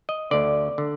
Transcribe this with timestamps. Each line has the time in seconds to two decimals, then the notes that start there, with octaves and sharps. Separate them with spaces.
0.09 D#5
0.31 D2 D3 D5
0.78 D3